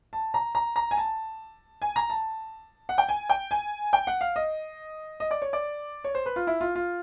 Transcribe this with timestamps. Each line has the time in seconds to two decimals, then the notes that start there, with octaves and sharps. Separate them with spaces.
0.13 A5
0.34 A#5
0.55 A#5
0.76 A#5
0.91 G#5
0.97 A5
1.82 G#5
1.96 A#5
2.10 A5
2.89 F#5
2.98 G5
3.09 G#5
3.29 G5
3.51 G#5
3.93 G5
4.07 F#5
4.21 F5
4.36 D#5
5.20 D#5
5.31 D5
5.42 C#5
5.53 D5
6.04 C#5
6.15 C5
6.26 B4
6.36 F4
6.47 E4
6.61 F4
6.75 F4